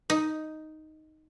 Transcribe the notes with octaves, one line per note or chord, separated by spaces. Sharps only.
D#4